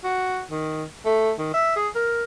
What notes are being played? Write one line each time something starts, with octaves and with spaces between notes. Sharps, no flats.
F#4
D#3
A3
D#3
E5
G#4
A#4